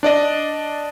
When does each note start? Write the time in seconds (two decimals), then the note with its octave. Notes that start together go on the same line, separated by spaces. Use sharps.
0.03 D4 D5 D#5